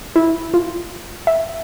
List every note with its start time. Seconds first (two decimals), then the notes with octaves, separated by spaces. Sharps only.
0.16 E4
0.54 F4
1.27 E5